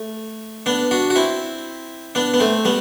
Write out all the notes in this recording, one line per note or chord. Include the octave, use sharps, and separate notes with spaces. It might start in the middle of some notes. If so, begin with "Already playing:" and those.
Already playing: A3
B3 D4
D4 F#4
F#4
C4 E4
B3 D4
B3
A3 C4
G3 B3